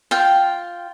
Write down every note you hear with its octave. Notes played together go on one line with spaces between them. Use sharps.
F4 G5